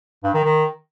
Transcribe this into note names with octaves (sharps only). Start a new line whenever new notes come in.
G2
D#3
D#3